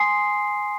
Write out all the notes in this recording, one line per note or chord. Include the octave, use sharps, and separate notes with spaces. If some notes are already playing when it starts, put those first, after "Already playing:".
Already playing: G#5 C6 D#6 C7